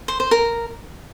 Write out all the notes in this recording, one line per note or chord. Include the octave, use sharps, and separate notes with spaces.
C5
C5
A#4